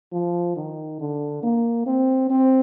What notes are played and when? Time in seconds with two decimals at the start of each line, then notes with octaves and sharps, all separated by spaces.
0.13 F3
0.56 D#3
1.00 D3
1.43 A#3
1.86 C4
2.30 C4